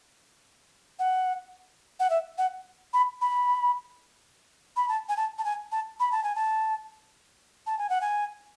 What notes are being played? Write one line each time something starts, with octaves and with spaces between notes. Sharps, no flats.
F#5
F#5
E5
F#5
B5
B5
B5
A5
G#5
A5
A5
G#5
A5
B5
A5
G#5
A5
A5
G#5
F#5
G#5